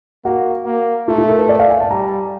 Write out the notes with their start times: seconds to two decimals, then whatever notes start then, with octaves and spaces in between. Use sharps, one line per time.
0.25 A#3 F#4
0.66 A#3
1.08 A3 F4
1.18 F4
1.28 A#4
1.39 B4
1.49 D5
1.59 F5
1.70 G#5
1.80 A5
1.91 G3 A#5